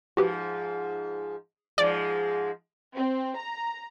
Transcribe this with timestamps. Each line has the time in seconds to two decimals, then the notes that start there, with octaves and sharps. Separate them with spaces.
0.17 G#2 F3 F#4 G4 B4
1.78 G#2 F3 G#3 D5
2.95 C4
3.36 A#5